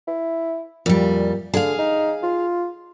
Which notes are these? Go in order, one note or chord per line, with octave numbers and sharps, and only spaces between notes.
E4
F2 A#2 G3
D3 G#4 F5
D#4
F4